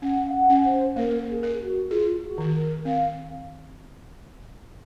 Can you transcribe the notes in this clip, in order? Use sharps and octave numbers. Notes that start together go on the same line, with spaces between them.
C#4 F#5
F5
F#5
C#4
C5
A#3 A#4
G#4
A#4
F#4
F4 G#4
F#4
D#3
A#4
C4 F5